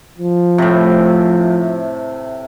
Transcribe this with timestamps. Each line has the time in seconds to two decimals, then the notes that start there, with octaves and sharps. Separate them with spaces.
0.18 F3
0.58 A2 C3